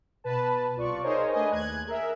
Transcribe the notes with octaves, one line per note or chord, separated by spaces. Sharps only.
B2 B4 A5
C2 F4 D5 C#6
D#4 G#4 A#4 C5 C#5 D#5
A3 D4 G#4 B4 D#5 G#5
D#2 F#6 G#6
G#4 A#4 E5